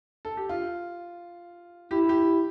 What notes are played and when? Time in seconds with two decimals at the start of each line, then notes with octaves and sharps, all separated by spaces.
0.25 A4
0.37 G4
0.49 F4
1.91 E4 G4
2.09 G4